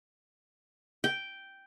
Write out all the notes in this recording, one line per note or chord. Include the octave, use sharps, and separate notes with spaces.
G5